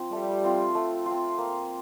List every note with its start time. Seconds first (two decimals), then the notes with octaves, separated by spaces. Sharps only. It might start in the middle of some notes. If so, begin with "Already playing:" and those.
Already playing: F3 C4
0.12 G3 A3
0.44 C4 F4
0.75 A3
1.06 F4
1.11 C4
1.38 A#3